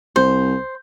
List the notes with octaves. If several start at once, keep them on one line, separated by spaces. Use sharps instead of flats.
C2 C5